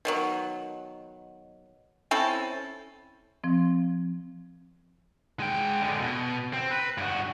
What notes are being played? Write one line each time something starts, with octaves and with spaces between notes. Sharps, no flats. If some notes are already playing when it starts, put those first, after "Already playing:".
B2 D#3 F#3
C4 C#4 E4 A4
F3 C4
G#3 G5
D3 G#3
B2
C4
B4
G2 F#4